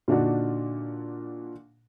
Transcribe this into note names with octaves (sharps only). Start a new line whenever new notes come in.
A#2 D3 D4 D#4 F#4